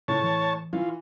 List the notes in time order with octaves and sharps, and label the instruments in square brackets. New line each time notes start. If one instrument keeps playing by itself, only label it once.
[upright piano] A2 [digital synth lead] C#3 [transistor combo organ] C#5 A5
[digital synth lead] E3
[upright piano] E3 [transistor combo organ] F4